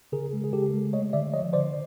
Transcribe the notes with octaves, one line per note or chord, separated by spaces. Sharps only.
C#3 G#4 A#4
G#3
G#4
C#3 G4 A4
G#3
A3 C#5 D#5
D3 D5 E5
F3 C#5 D#5
D3 C5 D5